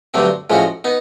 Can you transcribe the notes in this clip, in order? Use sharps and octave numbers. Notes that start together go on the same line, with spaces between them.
G2 D3 F#3 A3 C4
A2 F3 G#3 C#4 F#4
B3 D#4